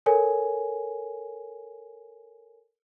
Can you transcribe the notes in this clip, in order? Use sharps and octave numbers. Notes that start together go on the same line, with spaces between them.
A4 A#4 C#5 G#5